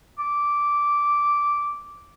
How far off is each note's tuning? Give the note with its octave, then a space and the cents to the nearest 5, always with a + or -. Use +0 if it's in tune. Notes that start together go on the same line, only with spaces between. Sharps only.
D6 -10